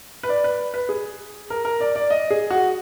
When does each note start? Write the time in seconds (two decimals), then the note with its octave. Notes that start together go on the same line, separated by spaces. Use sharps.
0.23 B4
0.29 D5
0.44 B4
0.74 B4
0.89 G#4
1.50 A#4
1.65 A#4
1.80 D5
1.95 D5
2.10 D#5
2.31 G#4
2.50 F#4